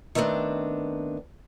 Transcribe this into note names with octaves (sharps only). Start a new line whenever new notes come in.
D#3 A3 B3 C4 D4